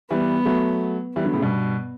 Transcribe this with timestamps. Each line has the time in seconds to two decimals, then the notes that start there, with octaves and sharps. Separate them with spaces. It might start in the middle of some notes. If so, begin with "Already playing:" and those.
0.10 E3 G3 B3
0.45 F#3 A3
1.16 E3 G3 B3
1.25 D3 F#3
1.33 A2 C#3
1.42 G2 B2